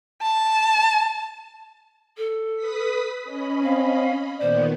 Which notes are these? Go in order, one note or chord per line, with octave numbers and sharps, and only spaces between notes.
A5
A4
B4 D#6 B6
C#4 D#5 B5
C4 F5
A#2 D#3 B3 C5 D5